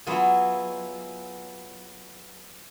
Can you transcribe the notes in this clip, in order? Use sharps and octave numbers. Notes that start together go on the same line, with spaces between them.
F#3 B3 E4 F4 G#4